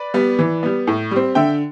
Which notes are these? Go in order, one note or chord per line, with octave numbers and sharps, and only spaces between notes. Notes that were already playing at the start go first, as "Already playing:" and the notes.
Already playing: B4 D5
G3 B3
E3
G3 B3
A2
G3 C4
D3 E5 G5